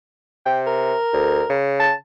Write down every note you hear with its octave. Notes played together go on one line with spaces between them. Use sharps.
C3 G5
A#4
D2
C#3
A5